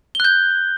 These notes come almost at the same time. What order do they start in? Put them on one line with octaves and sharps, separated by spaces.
G7 F#6 G6